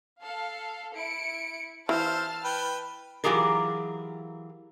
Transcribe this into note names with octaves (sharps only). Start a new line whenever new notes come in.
A4 F5
E4 C#7 D7
E3 C5 E5 F5 A5 F6
B4 G5
E3 F#3 F4 G4 G#4 A#4